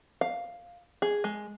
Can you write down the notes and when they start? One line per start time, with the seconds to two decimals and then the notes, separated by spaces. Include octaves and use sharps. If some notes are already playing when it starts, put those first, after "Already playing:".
0.21 F5
1.02 G#4
1.24 G#3